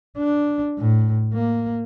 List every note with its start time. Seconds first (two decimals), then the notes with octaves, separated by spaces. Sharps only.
0.17 D4
0.78 A2
1.33 A#3